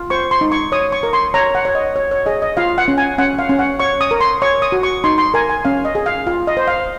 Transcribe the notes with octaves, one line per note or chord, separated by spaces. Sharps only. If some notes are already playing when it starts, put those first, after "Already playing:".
Already playing: F4
C5 C#6
C6
D#4
C#6
C#5 D#6
C#6
A#4
C6
C#5 A#5
F#5
C#5
D#5
C#5
C#5
G#4 D#5
D#5
F4 F5
F#5
C#4
G#5
C#4 F#5
F5
C#4
F#5
C#5 C#6
D#6
A#4
C6
C#5 C#6
D#6
F#4
C#6
D#4 C6
C6
A#4 G#5
G#5
C#4 F5
D#5
G#4
F5
F4 F5
D#5
C5
F5